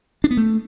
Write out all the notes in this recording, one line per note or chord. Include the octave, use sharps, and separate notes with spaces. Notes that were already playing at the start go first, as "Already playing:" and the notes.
D4
B3
A3